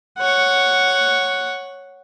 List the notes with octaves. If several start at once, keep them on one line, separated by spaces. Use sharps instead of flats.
C#5 F#5